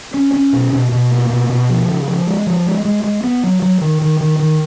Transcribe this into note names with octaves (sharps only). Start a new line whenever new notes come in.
C#4
C#4
B2
B2
B2
A#3
B2
B2
F3
C#3
F3
G#3
F3
G#3
G#3
G#3
B3
F#3
F#3
D#3
D#3
D#3
D#3